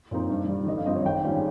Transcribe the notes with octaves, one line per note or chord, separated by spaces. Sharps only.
A#2 F3 C4 D#4
G2
D#3 G3
G1 D#5
F5
G2 F3 C4 D#5
C#5
G#1 G5
G#2 G3 C#4 F4